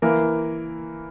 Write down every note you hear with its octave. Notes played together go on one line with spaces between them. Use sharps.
E3 A#3 E4 A#4